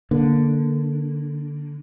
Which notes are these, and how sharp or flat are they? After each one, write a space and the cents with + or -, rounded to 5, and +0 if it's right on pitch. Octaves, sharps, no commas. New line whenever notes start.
D3 +0 A#3 +0